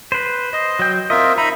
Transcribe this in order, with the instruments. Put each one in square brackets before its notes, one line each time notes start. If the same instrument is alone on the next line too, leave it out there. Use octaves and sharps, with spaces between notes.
[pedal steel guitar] B4 C5
[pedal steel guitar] C5 [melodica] D#5
[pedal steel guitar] F#3 G5
[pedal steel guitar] C4 D#5 [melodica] F4 A#4 E5
[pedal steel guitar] D#4 [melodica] E5 A#5 B5